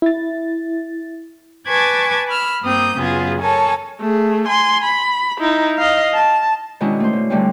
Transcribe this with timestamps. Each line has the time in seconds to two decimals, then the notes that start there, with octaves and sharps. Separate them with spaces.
0.02 E4 A6
1.68 B4 G#5 A5 C#6 D6 G#6
2.28 B5 E6 F6
2.62 G2 A#3 C4 D#6 G6
2.96 F#2 C#3 B3 F4 G#4
3.42 A4 A#4 C#5 G#5 A5
4.00 A3 G#4
4.47 G#5 C6
4.84 B5
5.40 D#4 E4
5.78 D#5 F5
6.14 A5
6.80 B2 D#3 G#3 C#4 D4 E4
7.00 A3 C5
7.13 B2
7.30 D3 G3 A3 C4 C#4